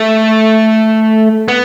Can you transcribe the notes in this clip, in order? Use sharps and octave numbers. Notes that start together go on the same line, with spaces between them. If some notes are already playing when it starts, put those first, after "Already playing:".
Already playing: A3
B3